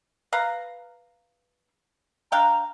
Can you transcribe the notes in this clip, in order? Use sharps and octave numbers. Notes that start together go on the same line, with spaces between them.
B4 F5 A#5
D4 F5 G5 A#5